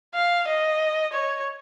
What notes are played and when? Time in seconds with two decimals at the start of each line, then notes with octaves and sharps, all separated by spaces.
0.15 F5
0.47 D#5
1.13 C#5